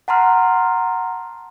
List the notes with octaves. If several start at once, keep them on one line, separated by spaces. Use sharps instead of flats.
F#5 A5 A#5 C6 F6